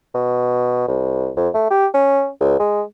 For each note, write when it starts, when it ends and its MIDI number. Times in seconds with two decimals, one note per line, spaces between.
0.14 0.84 47
0.88 1.31 36
1.37 1.49 41
1.54 1.70 57
1.70 1.87 67
1.94 2.28 61
2.40 2.58 37
2.59 2.82 56